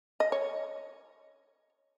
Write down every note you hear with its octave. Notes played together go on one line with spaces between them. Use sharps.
D#5
C#5